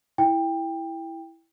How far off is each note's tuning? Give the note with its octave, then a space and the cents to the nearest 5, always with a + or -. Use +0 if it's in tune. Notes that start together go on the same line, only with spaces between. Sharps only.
E4 +0 G5 +20